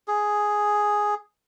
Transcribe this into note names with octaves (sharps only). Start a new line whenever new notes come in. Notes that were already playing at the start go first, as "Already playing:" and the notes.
G#4